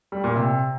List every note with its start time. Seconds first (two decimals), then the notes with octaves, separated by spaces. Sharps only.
0.12 G3
0.24 A#2
0.36 C3